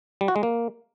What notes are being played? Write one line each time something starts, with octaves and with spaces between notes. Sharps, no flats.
G3
F#4
G#3
A#3